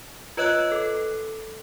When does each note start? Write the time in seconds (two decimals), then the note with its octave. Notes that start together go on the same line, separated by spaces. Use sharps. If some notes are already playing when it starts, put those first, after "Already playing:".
0.37 F4 B4 C#5 D#5 E6 F#6
0.72 A4